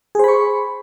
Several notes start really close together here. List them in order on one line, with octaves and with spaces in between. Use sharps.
G#4 C5 B5 C#6